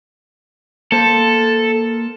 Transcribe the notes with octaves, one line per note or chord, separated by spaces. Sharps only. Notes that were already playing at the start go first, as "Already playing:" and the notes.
A#3 A4 C5